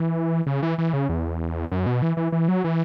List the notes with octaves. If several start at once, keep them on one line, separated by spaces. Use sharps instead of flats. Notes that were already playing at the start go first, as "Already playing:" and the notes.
Already playing: E3
C#3
E3
E3
C#3
E2
F#2
B2
E3
E3
E3
F#3
E3